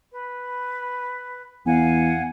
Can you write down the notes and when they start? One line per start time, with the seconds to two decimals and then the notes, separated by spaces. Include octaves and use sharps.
0.11 B4
1.66 E2 F5 F#5 G#5